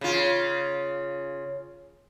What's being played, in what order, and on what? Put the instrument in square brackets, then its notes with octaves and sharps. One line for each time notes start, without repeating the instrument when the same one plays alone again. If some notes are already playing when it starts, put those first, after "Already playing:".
[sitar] C#3 F4